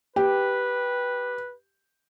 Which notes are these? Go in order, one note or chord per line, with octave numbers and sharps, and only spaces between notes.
G4 B4